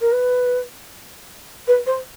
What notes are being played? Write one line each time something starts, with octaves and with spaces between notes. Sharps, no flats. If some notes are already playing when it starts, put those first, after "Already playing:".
A#4
B4
B4
C5